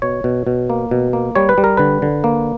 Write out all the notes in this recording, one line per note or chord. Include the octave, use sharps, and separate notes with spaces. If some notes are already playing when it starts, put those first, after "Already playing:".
B2 C#5
B2
B2
A#3
B2
A#3
G3 C#5
B4
G3
A#4
D3 B4
D3
A#3